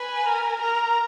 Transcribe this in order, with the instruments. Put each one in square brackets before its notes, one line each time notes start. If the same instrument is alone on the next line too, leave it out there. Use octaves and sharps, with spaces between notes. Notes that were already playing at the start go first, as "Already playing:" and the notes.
Already playing: [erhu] B4 [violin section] G#5
[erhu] A#4
[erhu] A#4 [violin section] A#5